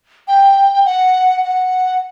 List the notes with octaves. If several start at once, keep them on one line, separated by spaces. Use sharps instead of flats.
G5
F#5
F#5